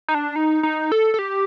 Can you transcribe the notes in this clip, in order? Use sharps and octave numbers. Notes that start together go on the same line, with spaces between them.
D#4
D4
D#4
D#4
A4
A4
G4